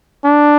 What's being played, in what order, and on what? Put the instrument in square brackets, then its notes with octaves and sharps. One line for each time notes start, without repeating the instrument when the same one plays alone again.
[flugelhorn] D4